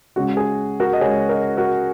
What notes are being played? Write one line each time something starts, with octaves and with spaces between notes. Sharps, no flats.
C#2 C#3 G#3 C#4 F#4
G#4
F#4 A#4
D#5
C#2 C#3 G#3 C#4 G#4 C#5
A#4 D#5
F#4 A#4